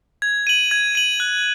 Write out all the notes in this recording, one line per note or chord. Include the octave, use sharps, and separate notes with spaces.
G#6
D#7 F#7
G#6
D#7 F#7
F#6